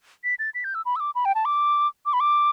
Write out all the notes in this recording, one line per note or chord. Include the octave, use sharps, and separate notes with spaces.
B6
A6
B6
G6
E6
B5
E6
D6
B5
G5
A5
D6
D6
B5
D6